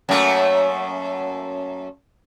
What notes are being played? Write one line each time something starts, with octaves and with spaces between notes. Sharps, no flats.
F#2 A3 A#3